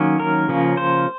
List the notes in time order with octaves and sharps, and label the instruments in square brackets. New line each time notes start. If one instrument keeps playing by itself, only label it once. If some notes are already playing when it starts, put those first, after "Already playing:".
Already playing: [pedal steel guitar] D#3 F#3 A#3 C#4
A#4
C#3 F3 A#3 C#4
C5